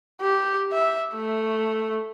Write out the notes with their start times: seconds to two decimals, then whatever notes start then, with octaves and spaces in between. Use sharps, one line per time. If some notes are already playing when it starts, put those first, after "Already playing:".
0.21 G4
0.72 E5
1.15 A3